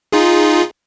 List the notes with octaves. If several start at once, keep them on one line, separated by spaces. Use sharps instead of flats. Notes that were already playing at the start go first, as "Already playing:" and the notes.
D#4 F4 G#4